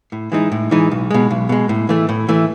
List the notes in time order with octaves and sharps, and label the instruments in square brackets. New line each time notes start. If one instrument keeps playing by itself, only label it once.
[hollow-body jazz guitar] A2
E3 G#3 D#4
A2
E3 G#3 D#4
B1
B2 G#3
B1
B2 G#3
A2
E3 A3
A2
E3 A3